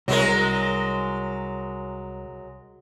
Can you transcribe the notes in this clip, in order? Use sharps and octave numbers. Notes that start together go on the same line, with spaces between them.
C2 F#3 G#3 A#4